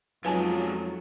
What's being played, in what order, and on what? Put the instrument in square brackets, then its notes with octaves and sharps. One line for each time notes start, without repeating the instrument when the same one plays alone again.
[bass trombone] F2 [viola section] F#3 [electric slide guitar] G#3 D#4 F4 [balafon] B4 G#5 A5